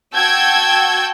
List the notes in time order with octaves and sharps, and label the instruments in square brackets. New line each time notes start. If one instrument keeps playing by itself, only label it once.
[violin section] F#4 G5 A5 E6 G6 G#6